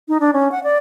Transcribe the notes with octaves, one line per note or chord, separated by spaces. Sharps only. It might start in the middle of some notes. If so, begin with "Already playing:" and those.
D#4
D4
C#4
F#5
D5